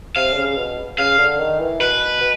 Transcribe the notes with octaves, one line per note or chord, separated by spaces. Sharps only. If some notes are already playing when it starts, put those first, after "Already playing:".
C3 F5
D3
C#3
B2
C#3 F5
D3
D#3
E3
B2 B4
B2